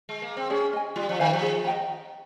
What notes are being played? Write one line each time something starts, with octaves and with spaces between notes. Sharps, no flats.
G#3
A#3
C4
C#4 G#4
D#5 G#5
G3 F4
F3
D#3 C5 F5 G#5
F3
G#4
D#5 G5 A#5